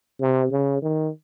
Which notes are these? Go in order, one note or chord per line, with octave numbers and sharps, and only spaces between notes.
C3
C#3
D#3